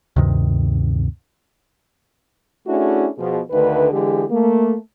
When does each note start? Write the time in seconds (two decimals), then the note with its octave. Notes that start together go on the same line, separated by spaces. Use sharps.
0.16 D2 G2 C3 D#3
2.67 A3 C#4 D4 E4 F#4 G#4
3.17 B2 F3 G#4
3.51 D2 D3 D#3 A3 B4
3.91 D3 E3 G#3 G4 G#4
4.30 A3 A#3